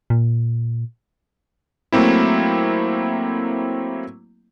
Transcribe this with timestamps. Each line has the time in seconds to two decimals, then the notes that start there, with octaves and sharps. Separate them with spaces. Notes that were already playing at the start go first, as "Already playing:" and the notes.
0.10 A#2
1.92 F#3 A3 A#3 C4 E4